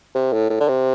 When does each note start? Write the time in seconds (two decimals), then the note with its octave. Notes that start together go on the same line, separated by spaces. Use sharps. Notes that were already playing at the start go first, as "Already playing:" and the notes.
0.15 C3
0.33 A2
0.50 A2
0.60 D3
0.68 C3